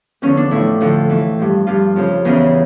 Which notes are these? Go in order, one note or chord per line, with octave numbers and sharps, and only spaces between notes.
E2 D3 F3 C#4
D4
A2 F3 E4
F2 D3 F3
A2 E3
G2 F3
G2 F3 F4
F2 C#3 F3
E2 C#3 E3